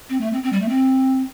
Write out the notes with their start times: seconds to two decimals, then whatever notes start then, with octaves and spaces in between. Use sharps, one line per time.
0.10 C4
0.21 A3
0.33 C4
0.43 C4
0.53 G3
0.61 A3
0.69 C4